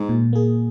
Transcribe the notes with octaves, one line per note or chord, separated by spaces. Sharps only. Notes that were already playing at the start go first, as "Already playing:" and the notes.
Already playing: G#2
A#2
A#3 G#4